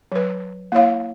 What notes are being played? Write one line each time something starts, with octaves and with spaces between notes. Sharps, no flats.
F#3 B4
A#3 E4 C#5 F5